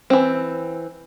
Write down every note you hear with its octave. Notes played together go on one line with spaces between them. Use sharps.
E3 C4